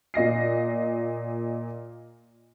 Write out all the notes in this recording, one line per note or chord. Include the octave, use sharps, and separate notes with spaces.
A#2 D#5 A#6 C7